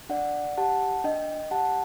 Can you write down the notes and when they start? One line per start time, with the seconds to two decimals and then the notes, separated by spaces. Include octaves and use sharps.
0.09 D4 D5 F#5
0.57 G4 F#5 A5
1.04 D4 D#5 G5
1.51 G4 F#5 A5